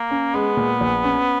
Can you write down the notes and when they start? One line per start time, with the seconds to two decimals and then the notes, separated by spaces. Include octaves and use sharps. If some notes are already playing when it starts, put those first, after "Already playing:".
Already playing: A#3
0.10 C#4
0.34 G#3 B3
0.57 A#2
0.81 A#1
1.04 C#4